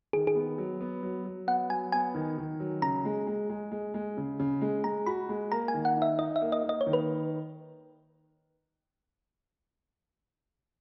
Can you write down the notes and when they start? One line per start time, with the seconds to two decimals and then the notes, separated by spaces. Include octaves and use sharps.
0.13 D#3 G#4
0.27 G#4
0.35 B3
0.58 F#3
0.81 B3
1.03 F#3
1.25 F#3
1.47 B3 F#5
1.70 F#3 G#5
1.92 B3 G#5
2.14 D#3
2.38 D#3
2.60 F#3
2.82 C#3 A#5
3.05 G#3
3.27 G#3
3.50 G#3
3.71 G#3
3.94 G#3
4.17 C#3
4.39 C#3
4.61 G#3
4.84 G#3 A#5
5.06 F#4 B5
5.29 G#3
5.52 A#3 A#5
5.68 G#5
5.74 D#3
5.85 F#5
5.96 D#4
6.02 E5
6.18 D#4 D#5
6.36 E5
6.41 A#3
6.52 D#5
6.63 A#3
6.69 D#5
6.81 C#5
6.86 D#3
6.93 B4